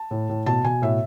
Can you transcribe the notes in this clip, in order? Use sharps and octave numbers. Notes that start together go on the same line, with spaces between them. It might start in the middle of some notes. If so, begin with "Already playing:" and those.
Already playing: A5
A2
A2
B2 A5
B2 G#5
A2 E5